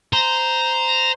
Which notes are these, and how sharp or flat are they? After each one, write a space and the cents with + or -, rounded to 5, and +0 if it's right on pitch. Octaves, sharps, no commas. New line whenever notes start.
C5 -10 A#5 +0